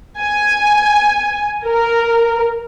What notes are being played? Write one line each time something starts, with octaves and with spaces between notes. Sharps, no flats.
G#5
A#4